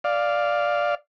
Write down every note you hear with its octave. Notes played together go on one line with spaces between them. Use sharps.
D5 F5